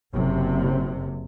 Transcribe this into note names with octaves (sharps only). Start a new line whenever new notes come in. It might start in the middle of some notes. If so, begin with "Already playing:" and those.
F#1 C3